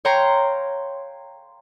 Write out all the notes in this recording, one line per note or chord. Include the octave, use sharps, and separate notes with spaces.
C#5 F5 G5 A#5 C6 C#7